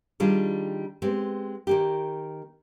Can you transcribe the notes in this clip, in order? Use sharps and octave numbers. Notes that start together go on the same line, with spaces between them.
D#3 G3 D4 F4 G#4
G#3 B3 C4 G4
D#3 A#3 G4